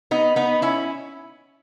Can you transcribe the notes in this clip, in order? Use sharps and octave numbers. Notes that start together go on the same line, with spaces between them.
B3 D#4
B3 D#4
C#4 E4